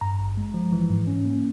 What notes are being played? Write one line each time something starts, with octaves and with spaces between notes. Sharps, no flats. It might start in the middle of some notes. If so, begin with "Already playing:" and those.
G2 A#5
G#1
G#3
F3
E3
G#2
C#4
A#3